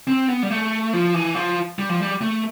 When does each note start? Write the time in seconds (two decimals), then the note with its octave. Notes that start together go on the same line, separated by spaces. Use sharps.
0.07 C4
0.29 B3
0.43 G3
0.50 A3
0.93 F3
1.14 E3
1.35 F3
1.79 G3
1.89 F3
2.01 G3
2.21 A3